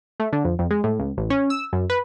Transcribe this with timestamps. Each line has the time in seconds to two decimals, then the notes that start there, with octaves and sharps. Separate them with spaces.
0.20 A3
0.33 D3
0.45 F2
0.59 F2
0.71 G#3
0.84 A2
0.99 C#2
1.17 A1
1.30 C#4
1.50 E6
1.73 F#2
1.90 B4